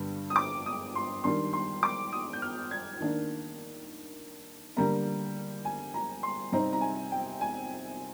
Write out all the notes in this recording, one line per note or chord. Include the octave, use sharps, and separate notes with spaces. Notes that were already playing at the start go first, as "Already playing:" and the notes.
Already playing: G2 D3 G3
D#6
D6
D#6
C6
D#3 G3 D4 C6
C6
D6
D#6
G6
F6
G#6
D#3 A#3 D4
D3 G3 A#3 A#5
G#5
A#5
C6
C3 G3 C4 D#4 A#5
A#5
G#5
G5
G#5